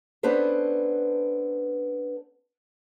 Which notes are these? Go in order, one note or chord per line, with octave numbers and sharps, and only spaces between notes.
B3 C#4 D4 A4 B4 C5